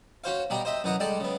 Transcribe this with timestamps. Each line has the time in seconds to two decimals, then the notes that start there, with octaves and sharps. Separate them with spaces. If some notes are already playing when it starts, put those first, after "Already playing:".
0.24 C#4 F#4 C5 F5
0.50 B2 G3 G4 A#5
0.65 C5 D#5 E5
0.84 F#2 E3 D#5 F#5 A#5
1.00 G3 G#3 A4 D5
1.20 C#3 B3